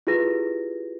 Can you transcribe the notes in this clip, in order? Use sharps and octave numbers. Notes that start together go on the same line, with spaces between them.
E4 F4 G4 G#4 B4 A#6